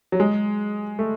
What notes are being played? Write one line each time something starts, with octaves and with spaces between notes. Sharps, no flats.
F#3
G#3
A3